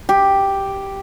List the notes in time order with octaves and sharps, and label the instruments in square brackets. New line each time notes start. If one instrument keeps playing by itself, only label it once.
[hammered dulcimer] G4